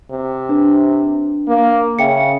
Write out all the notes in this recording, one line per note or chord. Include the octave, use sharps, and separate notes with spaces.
C3
D4 B4
A#3
C#3 E5 G5 C#7